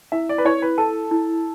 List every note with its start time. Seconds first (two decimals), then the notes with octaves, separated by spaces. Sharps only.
0.12 E4 E5
0.29 D5
0.38 B4
0.45 E4 C#5
0.62 B4
0.78 A4 A5
1.11 E4